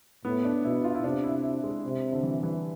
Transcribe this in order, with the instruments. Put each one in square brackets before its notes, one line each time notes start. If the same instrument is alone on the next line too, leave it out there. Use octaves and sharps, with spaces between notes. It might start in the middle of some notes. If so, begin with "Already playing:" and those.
[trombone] A2 [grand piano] B3
[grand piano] D4
[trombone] B2 [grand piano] E4
[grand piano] E4
F4
E4
[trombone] C3 [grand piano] D4
[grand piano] E4
E4
G#3
[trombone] C3
[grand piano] D3
E3
E3